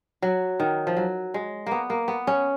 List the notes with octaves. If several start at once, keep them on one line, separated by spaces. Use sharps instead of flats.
F#3
D#3
F3
F#3
G#3
A#3 B3
A#3
B3
C#4